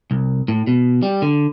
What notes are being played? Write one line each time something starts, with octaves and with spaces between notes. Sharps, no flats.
C2
A2
B2
G3
D3